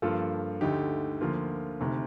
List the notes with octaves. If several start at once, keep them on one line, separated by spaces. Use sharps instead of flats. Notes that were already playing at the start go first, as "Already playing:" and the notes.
G2 F3 A#3 F4 A4
D2 D3 A3 D#4 G4
D2 D3 F3 A#3 F4
D2 C3 D#3